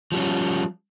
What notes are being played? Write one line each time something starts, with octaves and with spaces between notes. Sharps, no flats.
F3 G3 C#4